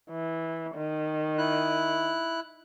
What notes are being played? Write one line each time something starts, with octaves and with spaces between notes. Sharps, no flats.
E3
D#3
E4 F#6